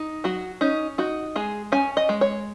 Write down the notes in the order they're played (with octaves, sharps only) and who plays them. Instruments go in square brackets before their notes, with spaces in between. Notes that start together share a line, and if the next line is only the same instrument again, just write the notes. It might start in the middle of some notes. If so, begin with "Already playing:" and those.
Already playing: [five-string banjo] D#4
F#3 F#4
C#4 D#4
D#4 F#4
G#3 G#4
C#4 G#5
D#5
G#3
C#5